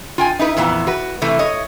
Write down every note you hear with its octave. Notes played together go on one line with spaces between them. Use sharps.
F4 G5 G#5
D#4 E4 B4
F2 A#2 E3 B3
F#4 B4
C3 E3 A3
C#5 D#5